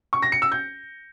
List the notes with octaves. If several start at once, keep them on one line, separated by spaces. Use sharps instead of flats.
C#6
A#6
C#7
E6
G6